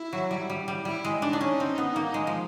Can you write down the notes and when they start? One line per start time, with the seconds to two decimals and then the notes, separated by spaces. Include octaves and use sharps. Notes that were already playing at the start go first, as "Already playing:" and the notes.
Already playing: E4
0.13 F#3
0.31 G3
0.50 G3
0.68 G3
0.85 G3 E4
1.05 G#3
1.22 D4 D#4
1.33 D4
1.41 C#4
1.60 C4
1.78 B3
1.96 A#3
2.14 G#3
2.27 F3